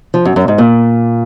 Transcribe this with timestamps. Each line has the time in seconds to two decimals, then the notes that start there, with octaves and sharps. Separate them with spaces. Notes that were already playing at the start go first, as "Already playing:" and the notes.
0.14 F3
0.25 F#2
0.36 F#2
0.48 G#2
0.58 A#2